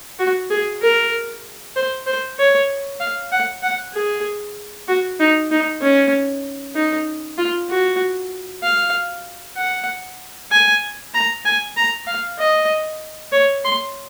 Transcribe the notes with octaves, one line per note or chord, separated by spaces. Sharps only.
F#4
G#4
A#4
C5
C5
C#5
F5
F#5
F#5
G#4
F#4
D#4
D#4
C#4
D#4
F4
F#4
F5
F#5
G#5
A#5
G#5
A#5
F5
D#5
C#5
C6